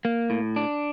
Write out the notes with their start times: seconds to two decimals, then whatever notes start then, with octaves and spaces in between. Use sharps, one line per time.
0.05 A#3
0.30 A2
0.56 D4